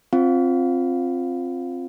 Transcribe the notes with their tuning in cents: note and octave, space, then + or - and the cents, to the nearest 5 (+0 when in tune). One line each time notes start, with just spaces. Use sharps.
C4 +10 F4 +5 F5 +0